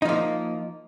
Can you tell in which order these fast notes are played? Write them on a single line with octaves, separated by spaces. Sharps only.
D#4 F3 A#3